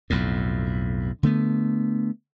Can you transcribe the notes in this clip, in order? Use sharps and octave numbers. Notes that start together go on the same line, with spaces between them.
B1 F2 A2
D3 A3 B3